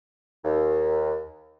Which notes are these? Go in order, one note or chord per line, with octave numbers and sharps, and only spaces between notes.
D#2